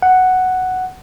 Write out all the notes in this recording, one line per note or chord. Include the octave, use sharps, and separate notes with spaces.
F#5